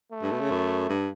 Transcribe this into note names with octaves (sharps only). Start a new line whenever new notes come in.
A3
G2
B2
C#3
F#2
G2